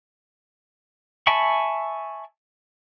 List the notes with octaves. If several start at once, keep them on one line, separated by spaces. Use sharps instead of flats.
E5 G#5 A5 B5 C#6